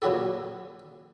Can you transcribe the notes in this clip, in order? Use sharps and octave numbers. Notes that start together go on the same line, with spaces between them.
A#2 C#3 F#3 F#4 G4 A4